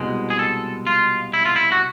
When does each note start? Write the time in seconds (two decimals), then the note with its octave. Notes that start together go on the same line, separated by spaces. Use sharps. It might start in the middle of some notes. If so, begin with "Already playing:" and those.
Already playing: C2 B2 G#3
0.30 G#4
0.39 A4
0.87 F4
1.34 E4
1.45 F4
1.56 E4
1.72 F#4